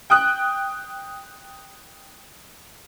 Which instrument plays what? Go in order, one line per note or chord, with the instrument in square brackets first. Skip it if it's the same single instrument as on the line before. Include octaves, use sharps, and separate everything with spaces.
[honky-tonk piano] G5 D#6 F#6